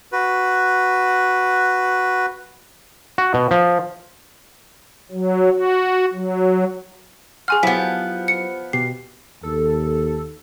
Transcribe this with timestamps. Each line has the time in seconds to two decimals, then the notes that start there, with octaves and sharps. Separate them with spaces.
0.12 F#4 B4
3.18 F#4
3.34 B2
3.51 F3
5.12 F#3
5.54 F#4
6.13 F#3
7.48 G#4 F#5 G#5 C6 C#6 F6
7.63 F3 F#3 B3 E4 G4 B6
8.28 C#7
8.73 B2 G4 C7
9.43 D#2 A4